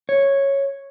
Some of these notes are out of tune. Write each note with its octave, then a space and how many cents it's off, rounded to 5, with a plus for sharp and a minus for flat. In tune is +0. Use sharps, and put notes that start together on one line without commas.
C#5 -5